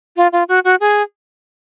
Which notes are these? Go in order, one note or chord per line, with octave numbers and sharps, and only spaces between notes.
F4
F4
F#4
F#4
G#4